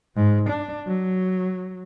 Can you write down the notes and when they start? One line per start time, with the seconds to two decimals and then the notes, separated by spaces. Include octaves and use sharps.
0.16 G#2
0.49 D4
0.87 F#3